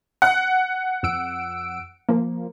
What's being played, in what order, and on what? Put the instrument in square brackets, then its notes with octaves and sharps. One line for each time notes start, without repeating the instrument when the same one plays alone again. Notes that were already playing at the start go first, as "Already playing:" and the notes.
[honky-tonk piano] F#5
[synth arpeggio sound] F2 E6 D7
F3 A#3